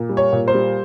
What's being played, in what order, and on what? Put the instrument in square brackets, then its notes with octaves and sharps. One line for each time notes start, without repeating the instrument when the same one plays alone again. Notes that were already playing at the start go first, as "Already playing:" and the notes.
Already playing: [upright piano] A#2
G3
C#5
A#2
C5
G3